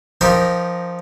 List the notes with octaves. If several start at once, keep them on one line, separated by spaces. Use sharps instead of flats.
F3 D#4 G4 A#4